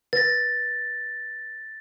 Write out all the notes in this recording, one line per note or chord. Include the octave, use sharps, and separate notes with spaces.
B4 A6 A#6